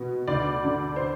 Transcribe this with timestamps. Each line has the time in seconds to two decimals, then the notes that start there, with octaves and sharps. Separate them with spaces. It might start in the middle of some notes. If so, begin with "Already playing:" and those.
Already playing: B2 B3
0.28 D2 D5
0.64 D3
0.96 C5